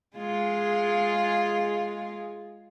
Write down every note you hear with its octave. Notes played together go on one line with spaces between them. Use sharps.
G#3 F4 G#4